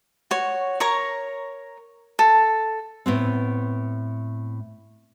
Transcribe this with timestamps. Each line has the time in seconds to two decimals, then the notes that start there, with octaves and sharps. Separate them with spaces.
0.31 F#4 C#5
0.80 A#4 C#5 A#5 C#6
2.19 A4
3.06 A2 B3 C4